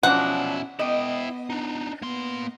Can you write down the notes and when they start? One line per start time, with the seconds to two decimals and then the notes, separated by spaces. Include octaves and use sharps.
0.03 B2 F3 F#3 C#4 D4 E4 F#5
0.79 B3 E4 D#5 G5
1.50 D4 D#4
2.02 A#3 B3 C6